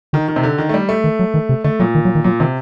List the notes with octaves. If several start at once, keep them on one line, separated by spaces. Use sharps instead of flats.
D3 D#3
D#3
C3
D3
D#3
A3
G3
A3
D#3
F#3
D#3
C3
D3 A3
A#2 F#3
D#3
F#3
D#3
A#2 F#3
C3 D#3